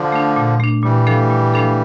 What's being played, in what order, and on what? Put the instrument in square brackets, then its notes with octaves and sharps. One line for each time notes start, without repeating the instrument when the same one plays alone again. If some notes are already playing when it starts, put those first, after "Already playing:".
Already playing: [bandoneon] D3 F3
[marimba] A3 D4
A#2
A3 D4
[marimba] A#2 [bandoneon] E3 G3
[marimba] F3 A3 D4 A4
A#2
F3 A3 D4 A4